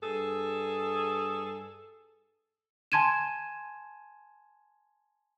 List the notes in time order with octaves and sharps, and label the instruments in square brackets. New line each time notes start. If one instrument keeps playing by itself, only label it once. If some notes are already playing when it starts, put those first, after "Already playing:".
[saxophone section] G2 G#4 A4
[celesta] G#5 A5 C6 G#6 D#7 E7